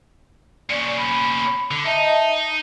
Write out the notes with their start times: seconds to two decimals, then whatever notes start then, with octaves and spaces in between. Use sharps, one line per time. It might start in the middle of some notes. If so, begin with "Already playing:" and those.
0.70 A#2 C#4 D5
0.97 B5
1.71 D3
1.85 D#4 D#5 E5 A5